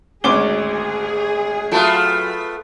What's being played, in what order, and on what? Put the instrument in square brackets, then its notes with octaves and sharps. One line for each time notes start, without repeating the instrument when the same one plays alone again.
[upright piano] G#1 C#6 G7 [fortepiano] D2 C#4 D6 [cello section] G#4
[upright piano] F#3 A5 D7 [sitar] A3 B3 F4